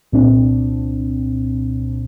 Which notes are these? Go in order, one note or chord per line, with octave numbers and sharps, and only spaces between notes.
C2 A#2 C4 D4